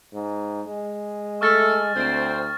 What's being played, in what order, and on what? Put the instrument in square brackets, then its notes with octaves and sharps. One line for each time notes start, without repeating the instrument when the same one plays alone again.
[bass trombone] G#2
G#3
[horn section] A3 A4 E5 [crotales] C#6 F6 A6
[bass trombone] D2 [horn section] C4